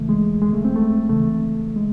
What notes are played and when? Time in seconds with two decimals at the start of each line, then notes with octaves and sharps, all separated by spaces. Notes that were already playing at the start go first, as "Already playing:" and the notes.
Already playing: E2 C#3 E3 A3
0.09 G#3
0.42 D#2 D#3 G#3
0.53 A3
0.65 C4
0.76 A3
1.09 C#2 C#3 E3 A3
1.76 G#3